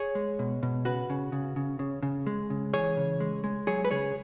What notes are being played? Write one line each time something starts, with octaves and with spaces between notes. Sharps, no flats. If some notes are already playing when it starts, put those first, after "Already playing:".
Already playing: G#4 C#5
G#3
B2
B2
C#3 F#4 B4
C#3
C#3
C#3
C#3
C#3
G#3
C#3
E3 G#4 C#5
C#3
G#3
G#3
F#3 G#4 C#5
B4
C#3 G#4 C#5